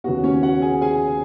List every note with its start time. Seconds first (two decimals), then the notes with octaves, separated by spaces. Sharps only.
0.04 D#2 C#3 B3 F#4
0.24 C#4 C#5
0.43 F#4 F#5
0.62 G#4 G#5
0.81 G#4 G#5